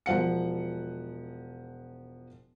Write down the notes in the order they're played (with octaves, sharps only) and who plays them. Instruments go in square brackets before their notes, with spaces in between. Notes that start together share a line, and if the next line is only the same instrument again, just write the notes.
[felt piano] E1 F3 F#5 C#7